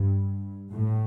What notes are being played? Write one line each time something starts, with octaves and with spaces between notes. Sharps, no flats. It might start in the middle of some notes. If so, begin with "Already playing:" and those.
Already playing: G2
A2